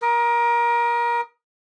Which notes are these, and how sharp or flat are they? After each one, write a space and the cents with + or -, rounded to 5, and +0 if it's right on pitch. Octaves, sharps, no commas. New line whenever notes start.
A#4 +25 D#6 +0